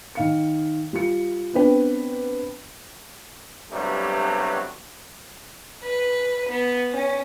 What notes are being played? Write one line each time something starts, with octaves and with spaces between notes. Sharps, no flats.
D#3 F5 C#7
G3 F4 C#7
B3 C4 D4 B4 G5
E2 G2 C3 F#3 G3 A3
B4
B3
C#4